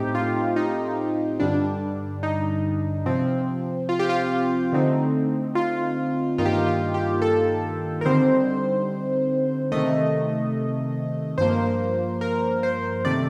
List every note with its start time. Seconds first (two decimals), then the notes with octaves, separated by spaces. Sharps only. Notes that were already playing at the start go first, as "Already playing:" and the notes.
Already playing: A2 A3 C4 D#4 G4
0.15 F4
0.56 D#4
1.40 G2 D3 G3 D4
2.23 D#4
3.06 C3 F3 C4
3.89 F4
3.99 G4
4.09 F4
4.72 D3 A3 C4 D#4
5.55 F4
6.38 G2 D#3 A#3 D#4 F4
6.45 G4
6.53 F4
6.66 F4
6.94 G4
7.22 A4
8.01 A#4
8.05 D3 G3 C4 D#4 C5
9.72 C3 D#3 A3 D#5
11.38 G2 F3 A#3 C5
12.21 A#4
12.63 C5
13.05 C3 D#3 A3 D5